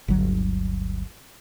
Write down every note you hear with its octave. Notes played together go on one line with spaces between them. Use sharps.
G1 D2 F#3